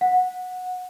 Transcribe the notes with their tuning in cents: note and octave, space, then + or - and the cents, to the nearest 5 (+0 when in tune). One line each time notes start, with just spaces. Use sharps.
F#5 -15